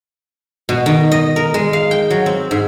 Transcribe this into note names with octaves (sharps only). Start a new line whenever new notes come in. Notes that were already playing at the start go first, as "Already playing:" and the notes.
B2
D#3
D#5
A#4
G#3
F5
G5
F#3
C4
G#2